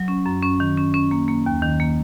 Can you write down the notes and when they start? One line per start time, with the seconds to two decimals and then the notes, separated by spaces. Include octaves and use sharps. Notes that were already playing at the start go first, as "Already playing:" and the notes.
Already playing: F#3
0.08 C#4
0.26 F#2
0.43 C#4
0.60 D#3
0.78 C#4
0.94 C#4
1.11 A#3
1.28 A#3
1.46 D#2
1.62 D#3
1.80 A#3